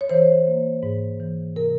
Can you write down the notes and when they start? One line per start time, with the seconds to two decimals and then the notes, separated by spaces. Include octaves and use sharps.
0.01 C#5
0.09 E3 C5
0.47 A#3
0.83 G#2
1.20 E3
1.56 C3 A#4